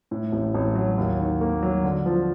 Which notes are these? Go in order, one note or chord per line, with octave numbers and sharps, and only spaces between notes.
A2
A1
A1
F#3
D#2
D#3
A#3
F#3
D3
F3